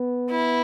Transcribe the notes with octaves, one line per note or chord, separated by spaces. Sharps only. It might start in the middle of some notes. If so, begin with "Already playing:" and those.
Already playing: B3
E4